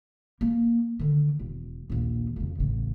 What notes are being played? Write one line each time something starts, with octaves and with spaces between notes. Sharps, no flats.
A#3
D3 D#3
E1
A#1 D#2
F2 C#3
A1 C#3